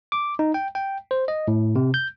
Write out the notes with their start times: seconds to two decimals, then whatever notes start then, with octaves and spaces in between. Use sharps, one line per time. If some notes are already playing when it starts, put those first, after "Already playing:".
0.12 D6
0.39 D#4
0.54 G5
0.75 G5
1.11 C5
1.28 D#5
1.48 A2
1.76 C3
1.94 G6